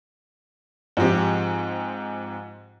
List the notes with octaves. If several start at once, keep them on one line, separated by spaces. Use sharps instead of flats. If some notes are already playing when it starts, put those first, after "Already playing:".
G#2 F3 C4 G4